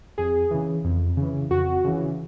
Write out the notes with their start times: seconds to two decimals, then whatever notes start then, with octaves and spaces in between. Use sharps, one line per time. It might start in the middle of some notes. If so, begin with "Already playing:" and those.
0.18 F2 G#4
0.51 C#3 E3
0.84 F2
1.17 C#3 E3
1.51 F2 F#4
1.84 C#3 E3